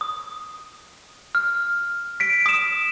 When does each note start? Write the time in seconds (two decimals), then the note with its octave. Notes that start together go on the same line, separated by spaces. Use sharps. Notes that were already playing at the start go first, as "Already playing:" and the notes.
0.01 D#6
1.35 F6
2.20 B6 D7
2.46 D#6 E7